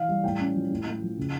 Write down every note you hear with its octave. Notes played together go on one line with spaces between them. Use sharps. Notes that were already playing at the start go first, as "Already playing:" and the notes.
Already playing: E3 F5
G3
A2 G5
C#4
F3
A2
A2
F3
C#3